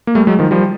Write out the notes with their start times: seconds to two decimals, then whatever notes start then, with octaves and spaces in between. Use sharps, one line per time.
0.07 A#3
0.15 G3 A3
0.27 F#3 G#3
0.39 D#3 F3
0.51 F3 G3